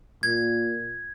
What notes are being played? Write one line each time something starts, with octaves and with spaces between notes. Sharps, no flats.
A#2 G#6